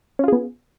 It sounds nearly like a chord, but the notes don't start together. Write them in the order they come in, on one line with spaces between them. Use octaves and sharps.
C#4 F4 G#4 B3